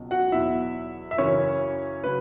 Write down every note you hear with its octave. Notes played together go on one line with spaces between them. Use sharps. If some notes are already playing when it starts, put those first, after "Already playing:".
Already playing: C#2 B2 F#3
F#4 F#5
E2 B2 F#3 E4 E5
E5
F#2 C#3 E3 C#4 C#5
C#3 F#3 B4